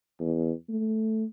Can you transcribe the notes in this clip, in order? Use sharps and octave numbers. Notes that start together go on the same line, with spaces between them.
E2
A3